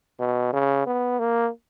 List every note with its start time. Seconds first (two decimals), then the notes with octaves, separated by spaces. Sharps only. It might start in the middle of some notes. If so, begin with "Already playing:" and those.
0.20 B2
0.53 C#3
0.87 B3
1.19 A#3